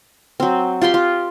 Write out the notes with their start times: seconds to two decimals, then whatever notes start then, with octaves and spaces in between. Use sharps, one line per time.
0.40 F#3 C4
0.82 F4 G4 G5 C6
0.94 F4